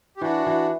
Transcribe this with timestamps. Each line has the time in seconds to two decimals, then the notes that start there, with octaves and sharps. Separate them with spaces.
0.17 G4
0.21 E3 D4 F#4
0.46 E3